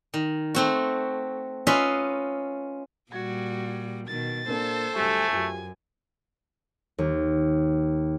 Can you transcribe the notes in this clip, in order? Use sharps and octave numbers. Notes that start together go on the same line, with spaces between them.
D#3
A3 C4 F#4
C#4 F4 B4 D#5 E5 C6
A#2 G3 F#4 G#6
B2 D#3 A6
A#2 A#3 D4 A4 C5
D2 F#3 G3 A3 G#5
F#2 F4 G4
D#2